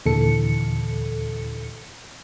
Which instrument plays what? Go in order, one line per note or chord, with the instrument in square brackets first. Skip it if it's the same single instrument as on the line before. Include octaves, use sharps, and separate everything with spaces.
[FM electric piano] D#2 A#2 D3 E3 A4 C#7